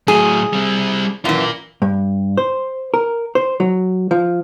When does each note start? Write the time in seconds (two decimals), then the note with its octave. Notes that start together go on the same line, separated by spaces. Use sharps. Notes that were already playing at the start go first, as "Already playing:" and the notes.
0.08 A2 F#3 G#4
0.53 G3 C4
1.25 F#2 E3 F4 A#4
1.82 G2
2.37 C5
2.94 A#4
3.35 C5
3.60 F#3
4.11 F3